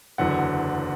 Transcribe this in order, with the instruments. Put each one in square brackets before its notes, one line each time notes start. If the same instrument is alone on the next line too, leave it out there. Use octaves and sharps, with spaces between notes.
[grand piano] F#1 E2 D3 F#3 F#5